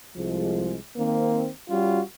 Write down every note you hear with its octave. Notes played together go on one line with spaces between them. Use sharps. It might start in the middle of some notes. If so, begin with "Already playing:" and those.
C2 F3 G#3
D#3 A#3 C4
G3 C#4 F4 F#4